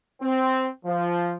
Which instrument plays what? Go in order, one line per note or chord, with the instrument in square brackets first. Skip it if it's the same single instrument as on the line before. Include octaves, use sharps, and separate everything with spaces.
[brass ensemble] C4
F3